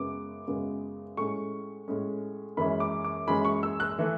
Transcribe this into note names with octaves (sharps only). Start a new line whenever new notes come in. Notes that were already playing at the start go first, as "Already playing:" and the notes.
Already playing: F#2 C#3 G#3 B3 D6
F#2 C#3 G#3 B3
A2 G#3 C#4 C#6
A2 G#3 C#4
F#2 E3 G#3 C#4 B5
D6
D6
F#2 E3 G#3 C#4 B5
C#6
E6
F#6
E3 A3